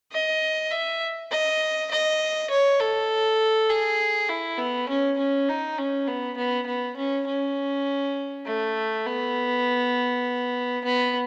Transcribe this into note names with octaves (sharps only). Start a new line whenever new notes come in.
D#5
E5
D#5
D#5
C#5
A4
G#4
E4
B3
C#4
C#4
D#4
C#4
B3
B3
B3
C#4
C#4
A3
B3
B3